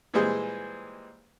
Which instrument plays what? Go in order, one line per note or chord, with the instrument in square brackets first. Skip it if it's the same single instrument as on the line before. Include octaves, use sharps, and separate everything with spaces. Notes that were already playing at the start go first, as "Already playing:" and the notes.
[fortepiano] A#2 E3 G3 G#3 G#4 C5